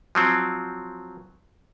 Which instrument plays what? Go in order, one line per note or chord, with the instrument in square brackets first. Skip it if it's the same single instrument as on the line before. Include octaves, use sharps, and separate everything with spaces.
[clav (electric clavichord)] F3 F#3 C4